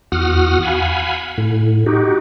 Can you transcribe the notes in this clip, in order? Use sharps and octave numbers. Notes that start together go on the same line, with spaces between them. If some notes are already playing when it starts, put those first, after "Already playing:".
E2 F#4 F#5 D#6 F6
F5 F#5 G#5 B5
A2
D#4 F#4 G4